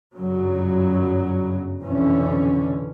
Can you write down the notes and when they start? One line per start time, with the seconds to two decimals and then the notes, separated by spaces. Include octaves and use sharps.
0.17 G1 F#2 C#3 F#3
1.82 F1 B1 F2 D3 E3 C#4